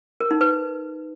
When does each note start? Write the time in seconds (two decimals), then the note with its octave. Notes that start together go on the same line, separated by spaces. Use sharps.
0.21 A#4
0.31 D#4
0.41 B4